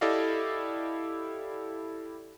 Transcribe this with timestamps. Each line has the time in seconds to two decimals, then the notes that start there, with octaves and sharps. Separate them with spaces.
0.01 E4 G4 A4 D5 D#5 F5